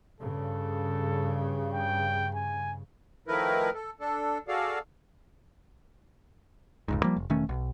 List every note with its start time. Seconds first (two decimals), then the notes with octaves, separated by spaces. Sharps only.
0.21 G2 C#3 A4
1.73 G5
2.35 G#5
3.28 D#3 F3 A3 E4 A#4 B4
3.74 A4
4.00 D4 A4
4.48 F#4 G#4 A4 D5 F5
6.88 F1 C#2 G#2
7.03 F3 G3 A#3
7.17 F1
7.30 E1 D#3 A3 C#4
7.49 B1